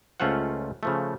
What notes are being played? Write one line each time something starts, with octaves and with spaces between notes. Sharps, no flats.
C#2 A3 C#4 F4 C5 F#5
C#3 F3 A3